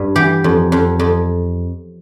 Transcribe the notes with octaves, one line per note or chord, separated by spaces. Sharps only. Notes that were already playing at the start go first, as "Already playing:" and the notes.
Already playing: G2 A4
E3 G4
F2
F2
F2